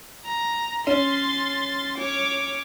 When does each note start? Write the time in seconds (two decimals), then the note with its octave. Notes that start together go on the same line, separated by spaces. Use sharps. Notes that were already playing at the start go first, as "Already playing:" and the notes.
0.25 A#5
0.87 C#4 C6 A6
1.97 C#5 D6